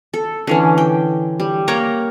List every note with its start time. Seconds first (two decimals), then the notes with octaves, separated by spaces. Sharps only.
0.14 A4
0.47 D3 E3 C#4
0.78 G5
1.40 G3
1.68 A#3 C#5 G5 A#5